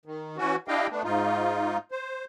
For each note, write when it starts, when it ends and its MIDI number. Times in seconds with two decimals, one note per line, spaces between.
0.06 0.37 51
0.37 0.56 52
0.37 0.56 61
0.37 0.56 66
0.68 0.87 62
0.68 0.87 64
0.68 0.87 67
0.68 0.87 75
0.68 0.87 77
0.68 0.87 79
0.90 1.02 57
0.90 1.02 59
0.90 1.02 62
1.04 1.77 44
1.04 1.77 63
1.04 1.77 65
1.91 2.25 72